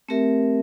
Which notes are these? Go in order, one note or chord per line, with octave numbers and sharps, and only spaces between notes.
A3 C4 G4 A#4 E5